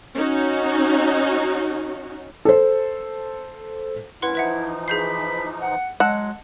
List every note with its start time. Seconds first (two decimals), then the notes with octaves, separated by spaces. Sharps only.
0.16 C#4 D#4 F#4
2.45 A4 C5
4.22 G2 A#3 C#4 E4 B4 F#5 C6
4.35 E3 F3 D#4 B4 E5 F#5
4.88 G#4 B5 G6 C7
5.61 F#5
6.00 F#3 G#3 D#5 F#5 A5 E6